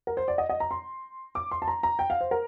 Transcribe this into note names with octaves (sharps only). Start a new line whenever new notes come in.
A#4
C5
D5
D#5
D#5
A#5
C6
D6
C6
A5
A#5
A#5
G5
F5
C5
A#4